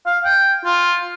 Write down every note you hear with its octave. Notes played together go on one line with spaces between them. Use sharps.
F5
G5
F4